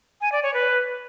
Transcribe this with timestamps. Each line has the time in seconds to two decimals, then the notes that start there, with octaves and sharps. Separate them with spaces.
0.21 G#5
0.32 D5
0.43 C#5
0.54 B4